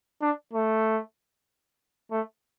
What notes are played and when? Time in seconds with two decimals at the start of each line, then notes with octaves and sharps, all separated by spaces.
0.21 D4
0.53 A3
2.11 A3